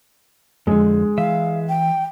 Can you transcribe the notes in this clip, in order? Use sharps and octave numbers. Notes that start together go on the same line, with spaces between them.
F2 D3 G#3
E3 E5 F5
G5